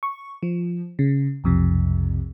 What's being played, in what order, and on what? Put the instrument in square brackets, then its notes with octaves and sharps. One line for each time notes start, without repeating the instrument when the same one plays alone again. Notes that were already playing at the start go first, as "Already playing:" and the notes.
[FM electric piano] C#6
F3
C#3
B1 F2 C3